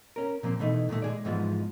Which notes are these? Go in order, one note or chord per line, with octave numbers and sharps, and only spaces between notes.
C#4 A#4
A#2 F3 A#3 C4
B2 E3 A3 D#4
A#2 D#3 G#3 A3
G#3 G#4 D5
G#2 E3 F3 G#3 B3 F4